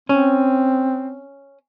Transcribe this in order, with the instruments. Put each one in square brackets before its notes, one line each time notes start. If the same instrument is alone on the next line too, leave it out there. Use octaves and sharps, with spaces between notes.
[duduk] C4 [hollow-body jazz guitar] C#4